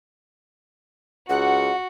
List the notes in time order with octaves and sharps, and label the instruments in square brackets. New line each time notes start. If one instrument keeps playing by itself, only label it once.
[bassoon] C#2 [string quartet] F#4 [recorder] F#5